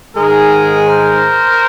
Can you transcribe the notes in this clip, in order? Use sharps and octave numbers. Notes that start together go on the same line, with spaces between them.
G#2 D#3 G#3 G#4 A#4
A#4 C5